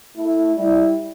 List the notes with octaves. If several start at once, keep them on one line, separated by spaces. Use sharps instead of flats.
A3 E4
G3 E4